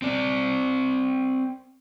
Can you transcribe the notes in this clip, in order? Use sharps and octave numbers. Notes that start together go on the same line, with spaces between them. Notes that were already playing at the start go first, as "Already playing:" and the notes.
C4 D5